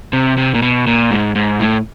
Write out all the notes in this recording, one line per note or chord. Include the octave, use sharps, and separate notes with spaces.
C3
C3
A#2
B2
A#2
G#2
G#2
A2